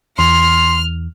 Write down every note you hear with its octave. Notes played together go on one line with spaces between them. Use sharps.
E2 C6 F6